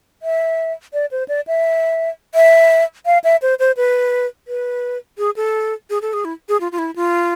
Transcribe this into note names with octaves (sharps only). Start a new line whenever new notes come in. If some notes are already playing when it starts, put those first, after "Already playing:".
E5
D5
C5
D5
E5
E5
F5
E5
C5
C5
B4
B4
G#4
A4
G#4
A4
G#4
E4
G#4
F4
F4
E4
F4